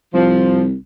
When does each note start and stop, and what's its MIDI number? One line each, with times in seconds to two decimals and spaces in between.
0.14 0.74 36
0.14 0.62 53